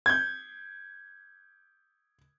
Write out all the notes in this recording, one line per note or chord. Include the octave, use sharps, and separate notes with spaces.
G6 G#6